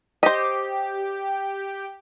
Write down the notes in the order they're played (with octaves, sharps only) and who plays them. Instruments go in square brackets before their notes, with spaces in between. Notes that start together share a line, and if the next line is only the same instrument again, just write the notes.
[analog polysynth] G4 [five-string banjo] C5 D#5